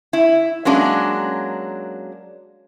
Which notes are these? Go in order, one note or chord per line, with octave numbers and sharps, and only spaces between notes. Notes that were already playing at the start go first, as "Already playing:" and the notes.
E4
F#3 G#3 A#3 C#4 D4